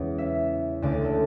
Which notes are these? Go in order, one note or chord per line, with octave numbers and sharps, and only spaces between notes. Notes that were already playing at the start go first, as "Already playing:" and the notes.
Already playing: E2 C#3 E3 G#3
E5
D2 C#3 E3 G#3 D5
D5
A4